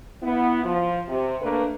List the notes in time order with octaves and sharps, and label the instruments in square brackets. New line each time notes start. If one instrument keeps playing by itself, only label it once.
[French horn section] B3 E4
F3
C3
A3 A#3 D4 B4